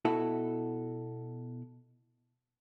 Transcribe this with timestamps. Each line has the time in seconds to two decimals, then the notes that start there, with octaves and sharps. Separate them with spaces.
0.05 B2 E4 F#4 A4